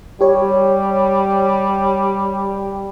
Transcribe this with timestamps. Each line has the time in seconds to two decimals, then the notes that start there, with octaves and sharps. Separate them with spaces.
0.21 G3 G4 C#5